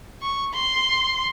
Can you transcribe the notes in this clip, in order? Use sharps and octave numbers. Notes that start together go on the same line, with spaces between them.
C#6
C6